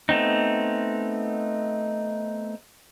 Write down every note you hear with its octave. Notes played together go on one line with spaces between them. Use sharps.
A3 B3 C4 D#4